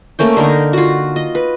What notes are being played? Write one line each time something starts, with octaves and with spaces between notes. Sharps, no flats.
A3 A#3 C#4 G5
D3 D#4 A#4
F4 F#4
D#5
B4